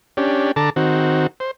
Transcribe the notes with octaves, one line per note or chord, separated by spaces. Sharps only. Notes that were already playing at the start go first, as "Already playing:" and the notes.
C#4 D4 G4
D3 A4 A5 A#5 D6
D#3 C4 F#4
C5